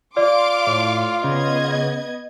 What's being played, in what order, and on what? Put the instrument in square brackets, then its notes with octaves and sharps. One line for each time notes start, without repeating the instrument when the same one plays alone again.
[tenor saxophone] F4 [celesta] D5 [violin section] F5 C6 D6
[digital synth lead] A2
[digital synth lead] C#3 [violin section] B3 D#5 G#6